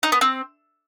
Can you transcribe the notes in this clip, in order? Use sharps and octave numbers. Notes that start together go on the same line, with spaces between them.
D#4
B3
C4